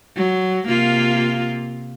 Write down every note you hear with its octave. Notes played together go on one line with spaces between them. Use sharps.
F#3
C3 A#3 F4